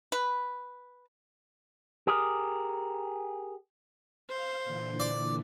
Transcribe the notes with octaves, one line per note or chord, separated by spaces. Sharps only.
B4
G4 G#4 A#4
C5 F5
A#2 D3 E3
D5